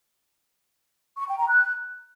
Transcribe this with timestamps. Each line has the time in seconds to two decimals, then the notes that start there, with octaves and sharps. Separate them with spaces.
1.17 C#6
1.27 G5
1.38 A#5
1.48 F#6